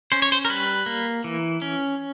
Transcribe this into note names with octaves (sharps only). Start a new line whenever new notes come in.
C#4 C5
C#5
C5
A#4
G3 B4
A#3
E3
C#4